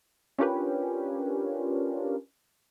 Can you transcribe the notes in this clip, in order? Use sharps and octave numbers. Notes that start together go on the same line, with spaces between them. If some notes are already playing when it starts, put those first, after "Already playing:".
C#4 D4 F4 G4 A#4 B4